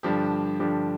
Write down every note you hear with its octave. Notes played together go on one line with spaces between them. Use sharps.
G2 D3 F3 D4 G4
G2 D3 F3 D4 G4